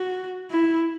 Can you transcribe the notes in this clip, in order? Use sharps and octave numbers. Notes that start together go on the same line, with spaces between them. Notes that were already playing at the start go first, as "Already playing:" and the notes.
Already playing: F#4
E4